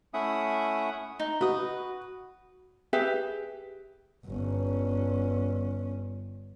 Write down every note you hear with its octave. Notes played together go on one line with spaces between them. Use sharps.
A3 C#4 E4 E5 F#5 D#6
D#4
F#4 B4 D#6
G4 G#4 B4 E5
G1 C#4